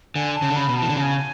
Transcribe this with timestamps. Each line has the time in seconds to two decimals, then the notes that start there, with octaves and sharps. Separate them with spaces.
0.15 D3 G#5
0.35 A5
0.42 C#3
0.50 D3
0.56 C#3 B5
0.69 B2
0.77 A5
0.82 E3
0.89 D3
0.96 C#3 G#5 A5